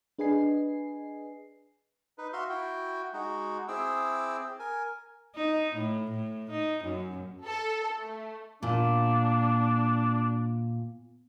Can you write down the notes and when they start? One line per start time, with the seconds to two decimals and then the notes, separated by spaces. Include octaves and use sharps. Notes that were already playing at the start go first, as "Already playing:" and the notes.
0.19 D4 G#4 B4 D#5 G#5 C7
2.18 D#4 B4
2.33 F#4 E5 F5 C6
2.50 E4 F#4 G5
3.13 G#3 D#4 F#4
3.68 C4 E4 G#4 G5 D6 E6
4.59 A#4 G#5
5.35 D#4
5.75 A2
6.10 A2
6.50 D#4
6.84 F#2
7.45 A4
7.97 A3
8.63 A#2 D4